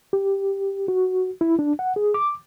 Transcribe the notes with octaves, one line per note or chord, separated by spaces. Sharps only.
G4
F#4
E4
D4
F#5
G#4
D6